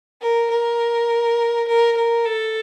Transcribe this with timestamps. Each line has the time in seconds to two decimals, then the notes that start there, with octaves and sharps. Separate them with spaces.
0.21 A#4
0.51 A#4
1.68 A#4
1.96 A#4
2.26 A4